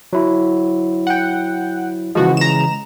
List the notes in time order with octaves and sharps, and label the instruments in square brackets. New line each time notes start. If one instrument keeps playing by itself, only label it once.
[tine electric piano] F#3 E4
[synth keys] F#5 G5
[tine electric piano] C#3 E3 G#3 [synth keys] F3 F#4
[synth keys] A#5 E7